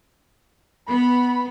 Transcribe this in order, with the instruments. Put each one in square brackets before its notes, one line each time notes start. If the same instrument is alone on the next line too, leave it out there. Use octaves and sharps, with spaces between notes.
[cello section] B3 [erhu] B5